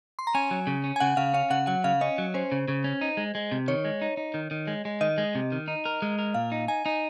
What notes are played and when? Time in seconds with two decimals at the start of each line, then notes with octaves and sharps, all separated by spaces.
0.19 C6
0.27 A#5
0.35 C#4 G#5
0.51 F#3
0.67 C#3
0.84 C#4
0.96 G#5
1.00 C#3 F#5
1.17 C#3 F5
1.34 C#4 F5
1.50 C#3 F#5
1.67 F#3 F#5
1.84 C#3 F5
2.01 C#4 D#5
2.18 F#3
2.34 C#4 C5
2.52 C#3
2.68 C#3
2.84 C#4
3.01 D#4
3.17 G#3
3.35 G#3
3.52 C3
3.68 D#3 C#5
3.85 G#3
4.02 D#4
4.17 D#4
4.34 D#3
4.51 D#3
4.67 G#3
4.85 G#3
5.01 D#3 D#5
5.18 G#3
5.35 C3
5.52 D#3
5.68 D#4
5.85 A#4
6.02 G#3
6.19 A#4
6.34 A#2 F5
6.52 D#4
6.68 D#4 G#5
6.86 D#4